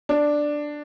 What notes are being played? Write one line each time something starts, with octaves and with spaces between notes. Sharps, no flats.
D4